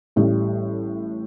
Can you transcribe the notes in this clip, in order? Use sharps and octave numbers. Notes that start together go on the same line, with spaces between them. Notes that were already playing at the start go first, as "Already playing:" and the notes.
A1 A2 G3